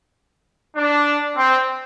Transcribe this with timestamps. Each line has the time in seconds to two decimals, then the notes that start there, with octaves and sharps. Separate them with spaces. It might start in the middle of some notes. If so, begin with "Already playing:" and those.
0.76 D4
1.36 C4